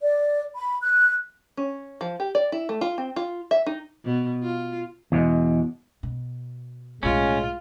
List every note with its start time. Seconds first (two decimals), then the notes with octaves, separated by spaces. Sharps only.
0.02 D5
0.55 B5
0.82 F#6
1.57 C#4
2.01 F3
2.20 G4
2.35 D5
2.52 E4
2.69 A3
2.81 F4
2.98 C4
3.16 F4
3.51 E5
3.67 D#4
4.04 B2
4.43 F4
5.12 E2 B2 G#3
6.03 B2
7.03 B1 A2 G#3 C#4 F4